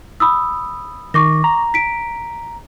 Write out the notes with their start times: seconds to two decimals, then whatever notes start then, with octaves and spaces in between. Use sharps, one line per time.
0.20 B5 D#6 E6
1.14 D#3 C#6 D6 A#6
1.44 A#5
1.74 B6 D7